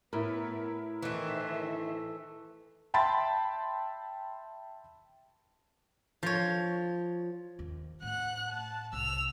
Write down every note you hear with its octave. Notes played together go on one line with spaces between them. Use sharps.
A2 B3 E4 A#4 B4
D#3 E3 A3 C5 E5
E5 G5 A5 B5 C6 A6
F3 C#5
D#2
A2 F#5 F#6
A5
C2 E6 F7